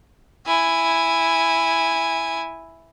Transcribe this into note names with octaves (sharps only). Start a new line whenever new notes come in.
E4 G#5